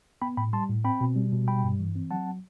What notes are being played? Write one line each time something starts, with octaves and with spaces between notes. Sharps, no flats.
B3 G5 B5
A2 G5 B5
G3 A5 C6
A2
C4 G5 B5
B2
G3
B2
G3 G5 B5
G2
E3
C4
F#3 F#5 A5